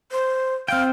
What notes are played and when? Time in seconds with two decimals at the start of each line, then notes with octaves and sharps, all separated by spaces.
0.12 C5
0.68 C4 F5 G5